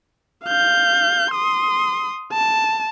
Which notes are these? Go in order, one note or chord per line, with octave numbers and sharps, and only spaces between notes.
F5 G6
C6 D#6
A5